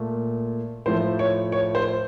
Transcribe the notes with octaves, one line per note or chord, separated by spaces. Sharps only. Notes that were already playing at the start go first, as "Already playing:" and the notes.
Already playing: A#2 A3
A2 F3 A3 C5
C#5
C#5
C5